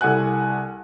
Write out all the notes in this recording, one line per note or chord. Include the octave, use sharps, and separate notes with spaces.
C2 A4 F#5 G#5 F#6